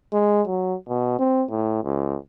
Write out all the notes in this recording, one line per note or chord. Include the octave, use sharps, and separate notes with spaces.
G#3
F#3
B2
C4
A2
C#2